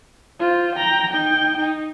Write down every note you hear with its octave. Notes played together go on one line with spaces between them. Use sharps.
F4 C5
G5 A#5
D#4 G5
D#4